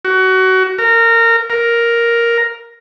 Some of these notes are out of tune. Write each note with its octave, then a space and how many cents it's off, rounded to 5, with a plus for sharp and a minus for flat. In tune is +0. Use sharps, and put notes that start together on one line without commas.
F#4 +25
A#4 -20
A#4 +5